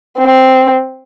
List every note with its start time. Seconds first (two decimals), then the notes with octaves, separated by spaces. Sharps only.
0.18 C4